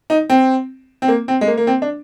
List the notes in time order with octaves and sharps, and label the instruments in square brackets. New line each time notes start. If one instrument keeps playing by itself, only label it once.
[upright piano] D#4
C4
C4
A#3
C4
G#3
A#3
A#3
C4
D4